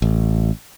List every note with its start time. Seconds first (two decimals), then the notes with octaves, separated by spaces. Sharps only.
0.02 A1